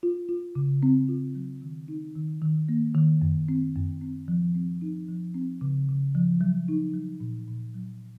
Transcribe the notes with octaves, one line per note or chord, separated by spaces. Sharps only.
F4
F4
C#3
C4
F4
F#3
D#3
D#4
D#3
D#3
A#3
D#3
F#2
C4
F#2
C4
F3
C4
D#4
F3
C4
C#3
C#3
F3
F#3
D#4
F#3
A#2
A#2
F#3